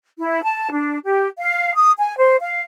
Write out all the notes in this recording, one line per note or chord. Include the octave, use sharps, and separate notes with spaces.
E4
A5
D4
G4
F5
D#6
G#5
C5
F5